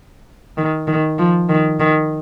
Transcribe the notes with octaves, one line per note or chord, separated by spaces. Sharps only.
D#3
D#3
F3
D#3
D#3